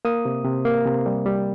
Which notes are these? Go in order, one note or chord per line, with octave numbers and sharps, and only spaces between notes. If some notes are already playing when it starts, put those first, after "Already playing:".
A#3 D#6
C3
C3
A#3
C3
G3
G3